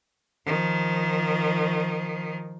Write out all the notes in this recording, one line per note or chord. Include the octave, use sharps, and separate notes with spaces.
D#3 F3